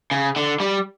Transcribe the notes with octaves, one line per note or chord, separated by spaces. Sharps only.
C#3
D3
G3